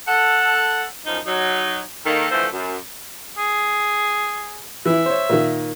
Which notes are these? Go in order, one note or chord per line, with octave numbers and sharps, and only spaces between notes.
A4 F#5
F#2 F3 D#4
F#3 D#4
D#3 A#3 A4
D3 E3 F3 A3 A4 C5
F#2
G#4
E3 E4 E5
C5 C#5
A#2 D#3